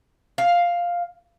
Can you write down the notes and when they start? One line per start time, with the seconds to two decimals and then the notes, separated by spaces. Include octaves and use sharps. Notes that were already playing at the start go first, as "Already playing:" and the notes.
0.38 F5